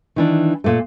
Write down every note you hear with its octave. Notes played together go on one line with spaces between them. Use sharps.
D#3 E3 D4
A#2 A3